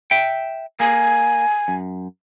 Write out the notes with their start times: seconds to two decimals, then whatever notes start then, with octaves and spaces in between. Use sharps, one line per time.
0.11 E5 G5
0.80 A#3 G#5
1.68 F#2